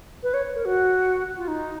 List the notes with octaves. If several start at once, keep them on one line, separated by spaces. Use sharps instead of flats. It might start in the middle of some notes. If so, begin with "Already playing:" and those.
B4
C#5
A#4
F#4
F4
D#4